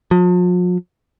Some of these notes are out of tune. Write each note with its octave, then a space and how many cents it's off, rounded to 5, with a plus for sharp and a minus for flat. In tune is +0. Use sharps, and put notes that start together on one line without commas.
F3 +45